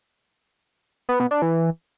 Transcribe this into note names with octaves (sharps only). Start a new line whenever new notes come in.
B3
B2
D4
E3